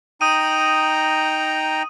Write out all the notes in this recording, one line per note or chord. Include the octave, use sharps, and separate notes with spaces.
D#4 G5 A#5 D#6 D#7